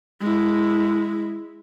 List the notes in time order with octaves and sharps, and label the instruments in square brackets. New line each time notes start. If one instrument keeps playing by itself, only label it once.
[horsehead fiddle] G#3 E4